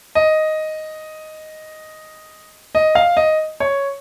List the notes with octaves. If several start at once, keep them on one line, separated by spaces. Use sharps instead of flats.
D#5
D#5
F5
D#5
C#5